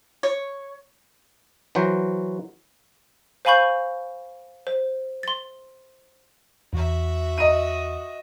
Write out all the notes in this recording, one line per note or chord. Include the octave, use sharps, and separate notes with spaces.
C#5
E3 F#3 F#4 C5
C5 F5 G#5 B5 C#6 G6
C5
C6 A6
E2 F#4 E5
D#5 D#7